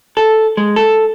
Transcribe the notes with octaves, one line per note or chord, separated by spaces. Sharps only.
A4
G#3
A4